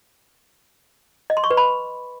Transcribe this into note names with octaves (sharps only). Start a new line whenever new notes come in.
D#5
C6
C#6
B4
B5